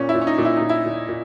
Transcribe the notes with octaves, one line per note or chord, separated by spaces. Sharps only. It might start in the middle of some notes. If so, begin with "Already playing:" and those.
Already playing: A#2 C#4
E4
A#2
C#4
D#4
A#2
E4
A#2 D#4
E4
A#2
A#2